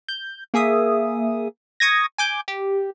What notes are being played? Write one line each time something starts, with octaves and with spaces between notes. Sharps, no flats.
G6
A#3 G#4 E5 D#6
C#6 D#6 G#6 A#6
G#5 D6 G6
G4